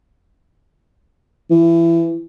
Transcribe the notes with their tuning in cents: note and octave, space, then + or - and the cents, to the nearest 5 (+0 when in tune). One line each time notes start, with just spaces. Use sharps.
E3 +25